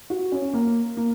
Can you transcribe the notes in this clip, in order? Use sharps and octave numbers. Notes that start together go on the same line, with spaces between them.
F#4
C#4
A#3
A#3